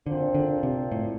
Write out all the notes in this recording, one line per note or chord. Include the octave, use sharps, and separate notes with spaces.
A#2 D3 F3 C4 F4 C5
D3
C3
A2